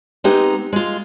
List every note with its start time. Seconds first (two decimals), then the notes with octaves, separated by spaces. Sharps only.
0.24 G#3 B3 C4 D#4 G4
0.73 G#3 F4